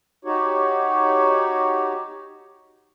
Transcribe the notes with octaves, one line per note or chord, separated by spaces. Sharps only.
D#4 F#4 G4 C#5